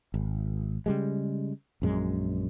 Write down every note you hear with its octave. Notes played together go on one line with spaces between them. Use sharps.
G#1
C#3 G3 G#3
A#1 F#2 G#3